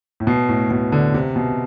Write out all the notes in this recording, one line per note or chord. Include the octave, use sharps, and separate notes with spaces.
A2
B2
A2
B2
D3
C3
B2